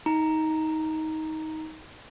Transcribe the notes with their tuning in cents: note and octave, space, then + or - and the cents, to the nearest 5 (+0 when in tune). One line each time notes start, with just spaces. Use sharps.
D#4 +20 A#5 +0